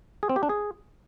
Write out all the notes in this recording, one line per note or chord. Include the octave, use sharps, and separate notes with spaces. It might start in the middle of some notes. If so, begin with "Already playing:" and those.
G#4
C4
G4
D4
G#4